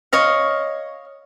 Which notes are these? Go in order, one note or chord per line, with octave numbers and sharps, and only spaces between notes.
C#5 D#5 F5